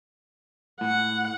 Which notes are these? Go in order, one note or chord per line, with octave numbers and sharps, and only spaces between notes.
A2 F#5